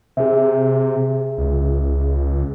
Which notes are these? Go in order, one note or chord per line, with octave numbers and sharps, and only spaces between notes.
C3 G#4 E5
C#2